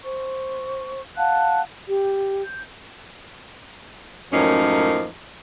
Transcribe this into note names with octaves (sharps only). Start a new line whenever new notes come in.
C5 C#6
F5 F#5 A5 F#6
G4
G6
F#2 A2 F3 A#3 C#4 D#4